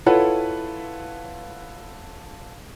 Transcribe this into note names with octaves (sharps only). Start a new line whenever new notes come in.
E4 F4 A4 B4 C#5 F#5